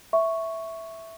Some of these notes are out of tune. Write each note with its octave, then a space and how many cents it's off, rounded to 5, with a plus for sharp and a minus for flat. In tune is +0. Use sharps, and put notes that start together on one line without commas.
E5 +0 C#6 +0